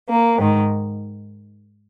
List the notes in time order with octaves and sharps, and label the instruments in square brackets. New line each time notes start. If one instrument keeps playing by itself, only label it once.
[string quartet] A#3
G#2 D#3